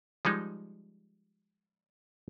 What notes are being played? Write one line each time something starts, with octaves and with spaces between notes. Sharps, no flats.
F3 G3 G#3 D#4